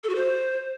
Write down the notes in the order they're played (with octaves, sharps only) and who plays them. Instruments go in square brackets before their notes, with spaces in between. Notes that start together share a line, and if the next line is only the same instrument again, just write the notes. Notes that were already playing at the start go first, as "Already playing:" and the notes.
[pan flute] A4
F#4
C5